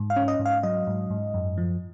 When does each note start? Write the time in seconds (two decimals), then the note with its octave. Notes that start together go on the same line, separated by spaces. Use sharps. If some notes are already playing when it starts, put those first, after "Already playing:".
Already playing: G#2
0.10 F5
0.16 C#4
0.28 D#5
0.39 G#2
0.46 F5
0.63 F#3 D#5
0.87 G#2
1.10 G#2
1.34 F#2
1.58 F3